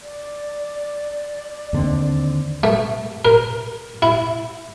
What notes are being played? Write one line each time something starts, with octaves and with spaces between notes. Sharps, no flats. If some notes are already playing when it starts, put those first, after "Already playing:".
D5
D#2 D3 C4
A3
A#4
E4